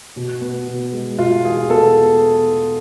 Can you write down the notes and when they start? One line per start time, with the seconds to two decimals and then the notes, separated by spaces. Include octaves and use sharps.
0.16 B2
0.41 B3
0.67 B2
0.93 G#3
1.19 B2 F4
1.45 E2 G#4
1.70 B3 A4